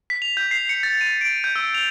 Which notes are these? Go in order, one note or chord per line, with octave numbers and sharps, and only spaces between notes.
B6
F7
G6
C7
C#7
A6
D#7
D7
G6
E6
F7